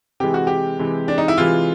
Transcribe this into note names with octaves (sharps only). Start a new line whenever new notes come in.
C3 E3 G#3 G4
F#4
G4
C3 E3 G#3
D4
D#4
E4
C3 E3 G#3 F4